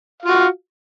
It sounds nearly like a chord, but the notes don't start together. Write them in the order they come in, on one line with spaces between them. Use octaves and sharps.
F5 F4 F#4